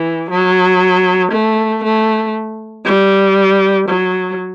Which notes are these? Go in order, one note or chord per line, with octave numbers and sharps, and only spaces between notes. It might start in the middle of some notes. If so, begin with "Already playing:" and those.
Already playing: E3
F#3
A3
A3
G3
F#3